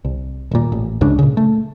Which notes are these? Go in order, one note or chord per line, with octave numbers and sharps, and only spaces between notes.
C2
D#1 A#2
A1
C#2 G#2 C#3 D4
A#2 C#3
A3